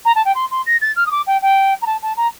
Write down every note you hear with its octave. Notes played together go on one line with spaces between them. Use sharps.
A#5
A5
G5
C6
C6
A#6
A6
F6
D#6
D6
G5
G5
A#5
A5
A5
A#5